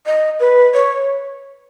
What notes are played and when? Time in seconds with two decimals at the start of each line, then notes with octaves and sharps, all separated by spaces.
0.06 D#5
0.40 B4
0.74 C#5